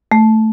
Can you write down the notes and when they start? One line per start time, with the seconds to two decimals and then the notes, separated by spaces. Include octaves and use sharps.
0.12 A3